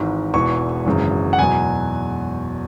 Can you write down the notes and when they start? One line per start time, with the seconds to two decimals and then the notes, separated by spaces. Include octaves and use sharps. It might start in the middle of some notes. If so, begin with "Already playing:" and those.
Already playing: G#1 G#2 E3
0.34 E1 E2 E3 C#6
0.86 G#1 F#2 C#3 E3
1.33 F#5
1.39 E2 B2 F#3 G#5